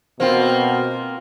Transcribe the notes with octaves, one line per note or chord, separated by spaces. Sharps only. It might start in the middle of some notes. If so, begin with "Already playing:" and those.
B2 A#3 C4 F4 C5 G5